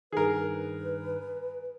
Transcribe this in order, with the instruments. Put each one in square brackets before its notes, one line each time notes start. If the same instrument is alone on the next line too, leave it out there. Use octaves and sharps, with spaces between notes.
[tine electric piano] G2 D#3 [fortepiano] G#4 A#4 [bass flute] B4